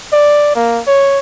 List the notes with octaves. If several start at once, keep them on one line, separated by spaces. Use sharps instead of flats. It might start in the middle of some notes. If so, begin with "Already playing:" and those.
D5
A#3
C#5